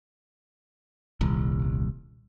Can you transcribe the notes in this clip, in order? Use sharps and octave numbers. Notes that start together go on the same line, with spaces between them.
D#1 C2